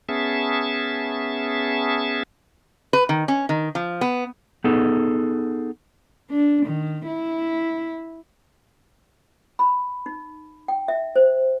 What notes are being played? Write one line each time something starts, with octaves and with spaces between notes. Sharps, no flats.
B3 C#4 G#4 E5 A5
B4
D#3
C#4
D#3
F3
B3
B3 D#4 G#4 A4
D4
D#3
E4
B5
D#4
G5
E5
C5